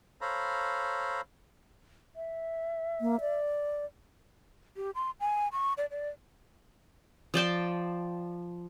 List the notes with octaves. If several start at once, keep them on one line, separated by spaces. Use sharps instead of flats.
A4 C5 C#5 F5 A#5 B5
E5
A#3
D5
G4
C6
G#5
C#6
D5
D5
F3 D5 G5 A5